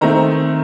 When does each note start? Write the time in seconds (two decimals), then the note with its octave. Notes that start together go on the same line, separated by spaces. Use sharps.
0.01 D#3 A3 C4 A#5